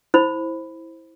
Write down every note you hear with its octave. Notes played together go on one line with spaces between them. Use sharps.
E4 C5 B5